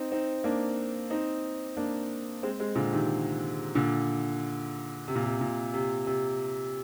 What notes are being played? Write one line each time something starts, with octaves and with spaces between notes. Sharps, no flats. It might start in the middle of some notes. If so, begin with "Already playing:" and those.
Already playing: C4 D#4
C4 D#4
A#3 D4
C4 D#4
A#3 D4
G#3 C4
G#3 C4
A#2 D3
C3 D#3
A#2 D3
C3
A#2
C3
A#2
C3
C3